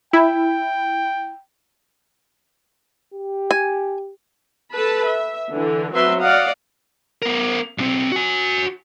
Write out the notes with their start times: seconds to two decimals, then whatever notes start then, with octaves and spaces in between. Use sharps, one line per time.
0.13 E4 G5
3.14 G4
3.51 G#5
4.72 A4 B4 A5 B5
5.06 E5
5.54 D3 E3
5.93 F#3 C4 B4 E5 C6
6.23 D5 D#5 F5 F#5
7.22 B3 A#4
7.78 B1 C4
8.12 F#4 G#5